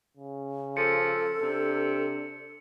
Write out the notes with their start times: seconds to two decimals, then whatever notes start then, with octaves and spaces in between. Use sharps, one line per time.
0.17 C#3
0.77 F3 A4 C#7
1.40 C3 D4